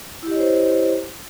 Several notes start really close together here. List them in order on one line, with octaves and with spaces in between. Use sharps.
E4 G4 D#5 C#5 C5